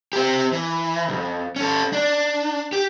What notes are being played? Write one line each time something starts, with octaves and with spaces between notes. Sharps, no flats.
C4 G4
E3
B1 F2
C#4 A4
D4
G4